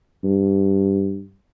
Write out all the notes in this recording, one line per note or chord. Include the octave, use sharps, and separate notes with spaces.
G2